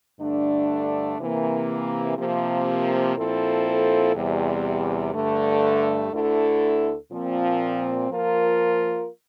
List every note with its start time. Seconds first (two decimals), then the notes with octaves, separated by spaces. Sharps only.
0.20 G2 D3 A3 D4
1.19 C3 E3 A#3
2.18 C3 F3 A#3
3.16 A#2 F3 C4 E4 A4
4.15 E2 C3 G3
5.14 G2 D3 A3
6.13 D2 D3 A3 E4 A4
7.12 A#2 F3 C4
8.10 F3 A#3 F4 A#4